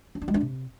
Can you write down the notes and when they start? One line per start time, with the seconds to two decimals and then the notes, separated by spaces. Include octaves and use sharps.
0.15 C#4
0.22 D4
0.28 G#3
0.34 D4
0.41 C3